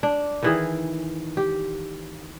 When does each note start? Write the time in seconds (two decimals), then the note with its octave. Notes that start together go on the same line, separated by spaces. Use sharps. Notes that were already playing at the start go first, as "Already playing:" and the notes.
0.03 D4
0.43 D#3 E3 G#4
1.37 G4